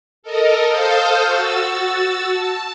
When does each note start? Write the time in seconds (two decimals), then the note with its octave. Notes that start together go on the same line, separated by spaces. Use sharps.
0.23 A4 A#4 D#5
0.68 A4 C5 F5 D#6 F6 G6
1.22 F#4 E6 A6
2.31 A5